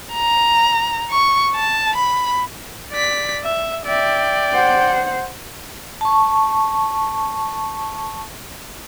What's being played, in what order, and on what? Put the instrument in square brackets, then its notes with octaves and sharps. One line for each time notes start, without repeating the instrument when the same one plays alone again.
[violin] A#5
C#6
A5
B5
[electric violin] D5 B6
E5
[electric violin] D5 G5 [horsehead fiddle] E5
[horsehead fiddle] C5 F#5
[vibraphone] A5 C#6